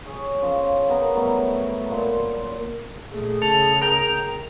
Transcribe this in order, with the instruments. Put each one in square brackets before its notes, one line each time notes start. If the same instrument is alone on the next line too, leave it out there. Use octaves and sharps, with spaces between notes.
[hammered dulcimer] G#4 C#5
C#3 F3
B3 A#4
A2 F#3 G3 A3
A#2 C6
[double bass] A#2 A3 [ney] G#4
[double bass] C#3 [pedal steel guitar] A4 [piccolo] F7
[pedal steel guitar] A#4 G5